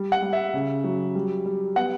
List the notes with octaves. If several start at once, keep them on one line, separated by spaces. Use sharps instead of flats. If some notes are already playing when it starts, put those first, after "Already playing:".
Already playing: G3
F#5
G3
E5
C#3
F#3
G3
G3
B3 F#5